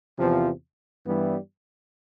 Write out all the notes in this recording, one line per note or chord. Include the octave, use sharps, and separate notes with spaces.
E2 C3 F3
G2 E3 G3 B3 E4